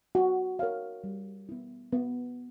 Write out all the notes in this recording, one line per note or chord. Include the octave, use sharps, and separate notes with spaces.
F#4
A#4 C#5 F5
G3
B3 E4
B3